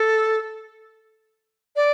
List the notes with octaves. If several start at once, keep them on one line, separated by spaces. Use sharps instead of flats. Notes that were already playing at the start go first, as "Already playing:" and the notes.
Already playing: A4
D5